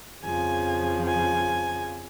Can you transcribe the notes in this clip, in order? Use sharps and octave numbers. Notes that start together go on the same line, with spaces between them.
F2 C#3 F3 G#5
G#5